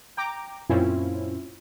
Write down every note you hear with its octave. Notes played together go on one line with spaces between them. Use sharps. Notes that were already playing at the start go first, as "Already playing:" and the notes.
G5 A#5 D6
F#2 A#2 C4 C#4 E4 F4